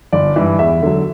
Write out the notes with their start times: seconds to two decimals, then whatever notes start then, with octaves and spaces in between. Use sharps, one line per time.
0.12 G1 D5
0.36 G2 E3 E5
0.59 E2 E5
0.82 D3 F#3